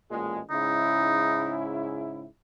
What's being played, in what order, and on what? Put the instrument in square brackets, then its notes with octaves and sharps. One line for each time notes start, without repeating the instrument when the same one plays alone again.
[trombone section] A1 A#2 G#3
[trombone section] G#2 C#3 E4 [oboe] D#4